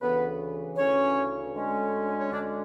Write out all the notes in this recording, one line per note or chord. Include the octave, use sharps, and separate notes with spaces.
D2 C#3 E3 B3 B4
D2 C#3 E3 C#4 C#5
D2 D3 G#3 C#4
C#5
D2 D3 G#3 C#4 D4 D5